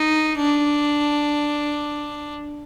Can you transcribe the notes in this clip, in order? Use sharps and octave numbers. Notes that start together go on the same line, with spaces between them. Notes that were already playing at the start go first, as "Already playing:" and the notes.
Already playing: D#4
D4